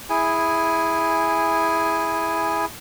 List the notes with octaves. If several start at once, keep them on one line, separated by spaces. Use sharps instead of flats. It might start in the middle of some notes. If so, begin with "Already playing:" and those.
E4 G#4 G#5